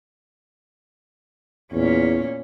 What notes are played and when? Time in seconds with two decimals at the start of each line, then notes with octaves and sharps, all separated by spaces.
1.72 E2 A#2 C#4